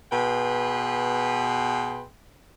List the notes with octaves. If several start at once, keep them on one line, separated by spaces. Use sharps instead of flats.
B2 G#4 B4 G5 C6